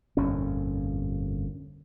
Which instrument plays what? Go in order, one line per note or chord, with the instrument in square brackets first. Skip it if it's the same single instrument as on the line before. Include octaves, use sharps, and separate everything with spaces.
[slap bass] G1 F2 A#2 C#4